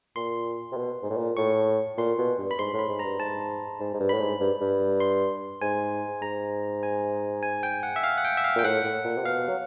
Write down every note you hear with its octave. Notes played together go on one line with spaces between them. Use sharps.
A#2 C6
C3
B2
G#2
A2
A#2
A2 C#6
A#2 C6
B2
G2
B5
G#2 C6
A2
B5
G#2
G2 A#5
G#2 A5
G#2
G#2
G2
A2 B5
G#2
G2
G2
C6
G#2 G#5
G#2 A#5
G#5
G#5
G5
F#5
E5
F5
F#5
G5
E5
F5
A#2 G5
A2 F#5
A2
A#2
C3
B2 F5
F#3